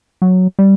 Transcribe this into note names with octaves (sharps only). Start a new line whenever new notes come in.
F#3
G3